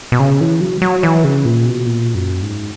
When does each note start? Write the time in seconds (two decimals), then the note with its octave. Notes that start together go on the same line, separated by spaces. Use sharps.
0.12 B2
0.20 C#3
0.41 E3
0.61 F#3
0.82 F#3
1.03 E3
1.24 C#3
1.45 A#2
1.66 B2
1.86 A#2
2.15 F#2
2.42 G#2